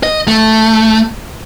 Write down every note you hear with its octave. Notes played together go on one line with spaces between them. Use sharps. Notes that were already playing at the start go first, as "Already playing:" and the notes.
D#5
A3